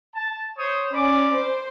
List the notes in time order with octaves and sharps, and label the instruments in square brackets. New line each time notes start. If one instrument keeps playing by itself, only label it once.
[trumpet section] A5
C5 C#5 D#6
[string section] C#4 [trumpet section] D5 B5 D6
[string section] C5